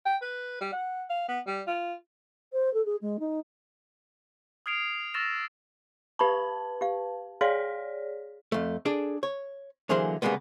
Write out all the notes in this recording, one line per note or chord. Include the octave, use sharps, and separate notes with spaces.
G5
B4
G3
F#5
F5
B3
G3
F4
C5
A4
G#4
G#3
D#4
D#6 F6 G#6 C7 D7 F7
C#6 E6 F6 A6 A#6 E7
G4 B4 A5 B5 C#6
G4 F5
G#4 C#5 D5 F5 C6
F2 A3
D4 G#4 A4 D5
C#5
D3 E3 F#3 A#3 G#4 C5
C#3 G3 G#3 A#3 B3